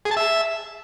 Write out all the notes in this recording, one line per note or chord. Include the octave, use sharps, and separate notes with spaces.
G#4
A5
E5